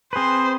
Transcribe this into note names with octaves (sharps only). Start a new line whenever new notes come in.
C4 G#4 B4 C5